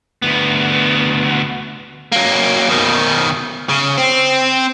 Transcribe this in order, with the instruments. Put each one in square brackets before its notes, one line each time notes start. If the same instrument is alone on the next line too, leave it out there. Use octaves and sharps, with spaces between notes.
[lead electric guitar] D2 B3
[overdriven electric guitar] F#3 A#3
B2 D#3
C#3
C4